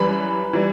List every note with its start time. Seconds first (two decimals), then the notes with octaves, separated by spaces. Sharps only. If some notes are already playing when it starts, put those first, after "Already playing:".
Already playing: F#2 E3 G3 B4 B5
0.53 E3 G3